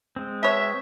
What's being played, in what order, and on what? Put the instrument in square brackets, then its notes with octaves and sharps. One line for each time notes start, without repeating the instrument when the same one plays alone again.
[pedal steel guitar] G#3 C4
[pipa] B2 C#5 [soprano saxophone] E5